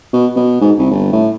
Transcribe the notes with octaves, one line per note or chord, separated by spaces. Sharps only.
B2
B2
G#2
C2
G1
A2